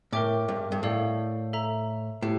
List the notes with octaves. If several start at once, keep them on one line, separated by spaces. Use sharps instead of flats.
A2 A#4 E5 G5 D6
G2
G2
A2 A4 D5 F5
A4 E5 A#5
A2 G4